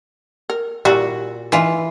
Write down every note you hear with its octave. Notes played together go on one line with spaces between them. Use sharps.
A#4
A#2 G3 E4 F#4
E3 D#4 F4 B4